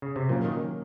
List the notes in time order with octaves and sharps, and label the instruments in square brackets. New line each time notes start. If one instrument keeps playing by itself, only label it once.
[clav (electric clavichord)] C#3
C3
[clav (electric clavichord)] A#2 [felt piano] F#3 A#3 C#4
[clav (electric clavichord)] D#3